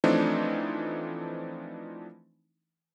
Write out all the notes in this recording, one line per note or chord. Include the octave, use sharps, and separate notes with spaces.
E3 F3 A3 C4 D4 D#4